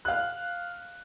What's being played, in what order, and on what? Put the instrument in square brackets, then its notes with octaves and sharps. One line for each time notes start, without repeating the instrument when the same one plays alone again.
[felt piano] F5 F#6